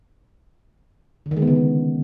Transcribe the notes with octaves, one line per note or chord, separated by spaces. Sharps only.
D3
D#3
G#3
B3
C#3